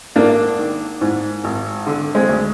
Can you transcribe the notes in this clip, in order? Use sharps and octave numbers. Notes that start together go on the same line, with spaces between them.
G#1 A#3 D4
D#3
G#2
G#1
D3
G#3 C4
D2